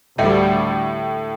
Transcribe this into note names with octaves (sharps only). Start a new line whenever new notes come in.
D2 A2 D3 G3 A3